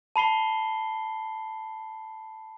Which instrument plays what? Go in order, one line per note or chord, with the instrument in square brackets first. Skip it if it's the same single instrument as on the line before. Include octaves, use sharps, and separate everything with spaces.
[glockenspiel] A5 B5 C7 G7